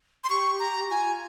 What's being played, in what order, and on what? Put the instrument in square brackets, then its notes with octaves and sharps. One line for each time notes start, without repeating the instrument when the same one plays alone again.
[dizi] C6
[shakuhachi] G4 [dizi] C#6
[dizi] A#5
[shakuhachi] F4 [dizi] G#5